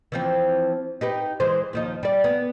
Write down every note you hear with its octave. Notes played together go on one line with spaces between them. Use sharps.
E3 F3 C4
D#4 G4 B4
E3 G#3 C5
D#2 F3 D#4
G3 D5
B3